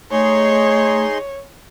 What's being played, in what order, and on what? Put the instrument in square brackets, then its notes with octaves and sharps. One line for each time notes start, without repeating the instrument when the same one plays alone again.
[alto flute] A3 [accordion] D#4 G#4 C6 [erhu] C#5